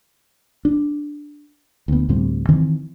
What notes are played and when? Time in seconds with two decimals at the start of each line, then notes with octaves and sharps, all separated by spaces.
0.65 D4
1.88 D2 B3
2.09 D2 A2 G3 C4
2.49 D#3 E3 C4